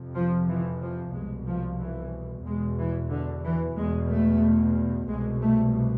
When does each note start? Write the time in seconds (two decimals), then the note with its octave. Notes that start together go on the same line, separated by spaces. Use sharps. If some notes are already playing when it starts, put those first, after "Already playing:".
Already playing: F2 C3
0.15 F3
0.48 E3
0.81 F3
1.14 C2 B2 G#3
1.47 F3
1.80 E3
2.46 E2 B2 G#3
2.78 E3
3.11 D3
3.44 E3
3.76 E2 B2 G#3
4.10 A3
5.08 C2 B2 G#3
5.42 A3